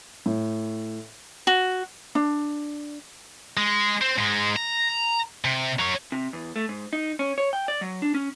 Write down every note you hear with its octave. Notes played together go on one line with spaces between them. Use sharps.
A2
F#4
D4
G#3
C4
G#2 G#3
A#5
C3
F#3 C#4
C3
E2
A3
G#2
D#4
C#4
C#5
G5
D5
F#3
D4
C#4